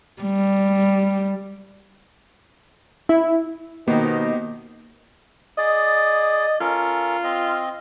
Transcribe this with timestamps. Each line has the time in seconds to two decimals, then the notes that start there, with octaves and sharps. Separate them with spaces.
0.22 G3
3.09 E4
3.88 B2 D#3 A#3 B3 G4 C5 D#5
5.58 G#4 D5 D#5
6.60 C#4 F4 A4 A#4
7.24 C4 D#5